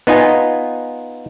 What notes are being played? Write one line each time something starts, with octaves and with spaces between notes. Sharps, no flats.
B3 D#4 F4 D#5 G#5